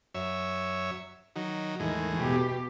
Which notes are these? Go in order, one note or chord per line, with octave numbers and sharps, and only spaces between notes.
F#2 C#5 E5
D#3 F#3
E2 A2 D#3 G#3
B2 G4